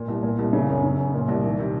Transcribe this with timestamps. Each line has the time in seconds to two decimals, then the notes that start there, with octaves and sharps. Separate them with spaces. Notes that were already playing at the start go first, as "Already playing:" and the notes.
Already playing: A#2
0.08 C2
0.23 A#2
0.39 C2
0.53 C#3
0.69 F#2
0.83 C#3
0.98 F#2
1.14 A#2
1.28 C2
1.44 D#3
1.59 C3